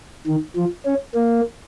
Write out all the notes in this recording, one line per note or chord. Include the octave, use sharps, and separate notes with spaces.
D#3
F3
C#4
A#3